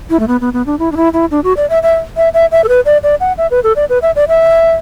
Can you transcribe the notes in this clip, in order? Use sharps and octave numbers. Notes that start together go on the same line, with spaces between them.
E4
A3
B3
B3
B3
D4
E4
D4
E4
E4
D4
F#4
D5
E5
E5
E5
E5
E5
A4
B4
D5
D5
F#5
E5
B4
A4
D5
B4
E5
D5
E5